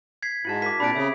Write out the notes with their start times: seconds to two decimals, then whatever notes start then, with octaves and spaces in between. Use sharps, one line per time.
0.23 G#6 B6 C7
0.45 G#2 E4 F#4 A5
0.62 E4 A#4 D6 B6
0.80 A#2 C4 D4 G4 B5 D7
0.95 C#3 G#4 E5